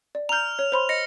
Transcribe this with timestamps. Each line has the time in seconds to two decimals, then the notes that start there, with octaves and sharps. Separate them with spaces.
0.15 D5
0.29 A#5 F6 G6 F7
0.59 C#5
0.72 C5 B5 C6
0.89 D#5 A#6 C#7